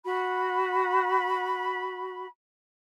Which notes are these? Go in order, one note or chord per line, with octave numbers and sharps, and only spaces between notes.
F#4 B5